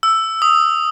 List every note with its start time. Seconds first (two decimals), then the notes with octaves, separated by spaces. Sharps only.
0.03 E6
0.42 D#6